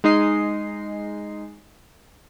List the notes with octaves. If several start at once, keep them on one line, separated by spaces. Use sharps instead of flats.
G#3 D#4 D#5 C7